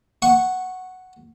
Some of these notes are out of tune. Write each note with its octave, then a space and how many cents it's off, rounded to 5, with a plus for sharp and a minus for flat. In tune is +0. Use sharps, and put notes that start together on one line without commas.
F#5 +0 C#6 -10